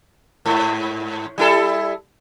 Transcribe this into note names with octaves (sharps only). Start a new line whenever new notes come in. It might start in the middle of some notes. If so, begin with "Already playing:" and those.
G#2
G3 E4 A4